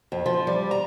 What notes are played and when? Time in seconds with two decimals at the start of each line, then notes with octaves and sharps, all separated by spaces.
0.12 F2
0.26 F3
0.47 G3
0.71 A#5